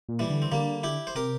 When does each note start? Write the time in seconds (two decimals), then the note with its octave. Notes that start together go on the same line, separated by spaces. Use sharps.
0.09 A#2
0.19 E3 G3
0.30 D3
0.42 C4
0.52 D3 G3 A#3
0.83 E4 G4
1.07 C5
1.15 C3 G4 A#4